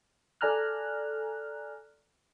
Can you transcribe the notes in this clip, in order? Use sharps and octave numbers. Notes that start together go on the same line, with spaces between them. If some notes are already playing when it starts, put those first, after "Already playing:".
A4 D5 G#5 A#5 F6 F#6